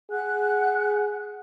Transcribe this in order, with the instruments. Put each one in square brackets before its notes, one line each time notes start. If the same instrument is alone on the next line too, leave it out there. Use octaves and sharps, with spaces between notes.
[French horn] G#4 [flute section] F#5 F#6